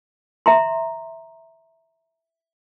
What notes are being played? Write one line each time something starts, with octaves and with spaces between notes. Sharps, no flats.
E5 A#5 C6